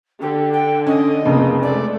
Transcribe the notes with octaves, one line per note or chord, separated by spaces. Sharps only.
D3 G4
G5
C#4 D#5
F1 F2 C#3 A#3
G#3 A3 D5